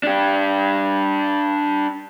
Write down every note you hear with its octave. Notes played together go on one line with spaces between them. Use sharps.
D4 G4